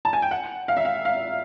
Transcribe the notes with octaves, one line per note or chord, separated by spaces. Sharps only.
A5
G#5
G5
F#5
F5
E5
F5
F5